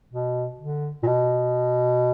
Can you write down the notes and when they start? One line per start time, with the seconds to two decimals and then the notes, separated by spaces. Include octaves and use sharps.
0.14 B2
0.60 D3
1.03 A#2
1.07 B2